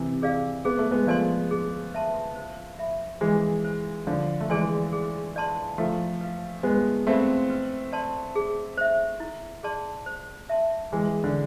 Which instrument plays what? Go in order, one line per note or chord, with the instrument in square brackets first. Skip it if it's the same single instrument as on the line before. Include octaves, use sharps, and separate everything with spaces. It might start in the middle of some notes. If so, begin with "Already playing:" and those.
Already playing: [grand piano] C3 E3
[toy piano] G#4 D5 F5
[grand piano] B3 [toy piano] G#4
[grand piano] A3
G#3 B3
[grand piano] F3 A3 [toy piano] D5 G#5 C6
[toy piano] G#4
B4 E5 A5 C6
C5
E5 B5
[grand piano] E3 G#3 [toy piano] G#4
[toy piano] C5 G#5
[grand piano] D3 F3 [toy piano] D4
[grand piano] A3
[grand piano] E3 G#3 [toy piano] G#4 D5 G#5 C6
[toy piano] G#4
D5 A5 C6
[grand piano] F3 A3 [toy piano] E4
[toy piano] B4 F5
[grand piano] G#3 B3 [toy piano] F4
[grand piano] A3 C4 [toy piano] A4 D5 F5 B5
[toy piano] B4
D5 A5 C6
G#4
C5 E5
E4
G#4 D5 A5 C6
C5
E5 A5 C6
[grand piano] E3 G#3 [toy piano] G#4
[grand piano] D3